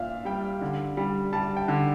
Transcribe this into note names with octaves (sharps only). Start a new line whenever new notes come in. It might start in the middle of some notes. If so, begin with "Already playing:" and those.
Already playing: A#2 D4 E5 F5
G3 G5
D3
G3
G3 A5
G5
D3